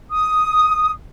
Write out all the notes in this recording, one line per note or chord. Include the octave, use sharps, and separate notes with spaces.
D#6